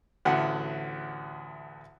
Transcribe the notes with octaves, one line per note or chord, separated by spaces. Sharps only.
A1 D2 F#5